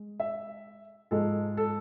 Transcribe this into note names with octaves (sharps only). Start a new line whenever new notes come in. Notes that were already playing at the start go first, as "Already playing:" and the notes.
Already playing: G#3
E5
G#2 F3 G#3 A4
A4